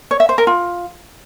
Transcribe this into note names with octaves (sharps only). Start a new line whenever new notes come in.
C#5
E5
C5
A#4
F4